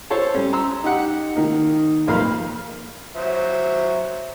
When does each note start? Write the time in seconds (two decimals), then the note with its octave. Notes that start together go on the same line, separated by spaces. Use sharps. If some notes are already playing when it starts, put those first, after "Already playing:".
0.10 A4 C5 C#5 A5
0.35 G3 C#4
0.53 A#5 C6 E6
0.84 D#4 G4 F#5
1.35 D#3 A#3 D#4
2.07 B1 F2 A#3 F5 B5 F6
3.16 F#3 C5 E5